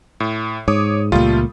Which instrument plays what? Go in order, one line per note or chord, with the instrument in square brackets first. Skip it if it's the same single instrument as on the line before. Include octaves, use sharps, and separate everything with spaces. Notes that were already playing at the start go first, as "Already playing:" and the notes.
[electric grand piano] A2
[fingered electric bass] G#2 [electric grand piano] C#5 D6 D#6
[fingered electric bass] C#2 A#2 [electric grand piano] G3 A3 F4